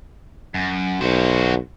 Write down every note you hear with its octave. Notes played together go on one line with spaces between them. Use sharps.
F#2
B1 F#4 C5